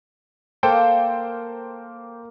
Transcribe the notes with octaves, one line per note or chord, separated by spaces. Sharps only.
A#3 A4 C5 G5